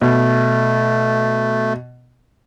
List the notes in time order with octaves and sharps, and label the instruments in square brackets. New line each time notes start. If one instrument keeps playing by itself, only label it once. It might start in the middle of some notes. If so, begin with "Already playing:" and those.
[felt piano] B2 [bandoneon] A3